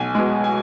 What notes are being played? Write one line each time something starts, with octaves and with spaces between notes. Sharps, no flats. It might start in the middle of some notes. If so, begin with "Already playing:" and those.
Already playing: B1 G#5
B2 G#3
G#5